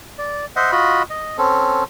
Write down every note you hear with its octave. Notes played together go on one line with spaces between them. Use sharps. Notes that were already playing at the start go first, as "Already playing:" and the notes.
D5
C5 D#5 E5 F#5
F4 F#4 D#5 B5
D#5
C4 C#4 A4